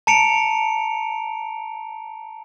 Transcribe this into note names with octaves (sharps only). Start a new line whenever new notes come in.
A5 A#5 C#7 D7 F7